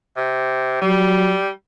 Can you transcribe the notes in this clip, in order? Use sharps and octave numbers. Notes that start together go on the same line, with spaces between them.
C3
F#3 G3